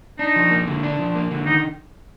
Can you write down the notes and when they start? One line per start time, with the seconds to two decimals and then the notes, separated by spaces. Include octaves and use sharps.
0.19 D4 D#4
0.36 F3
0.51 A#3
0.67 D3
0.83 D4
0.99 F3
1.16 A#3
1.31 D3
1.46 D#3 D#4